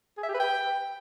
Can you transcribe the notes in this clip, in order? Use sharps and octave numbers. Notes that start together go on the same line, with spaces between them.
G#4
E5
G4
B4
G5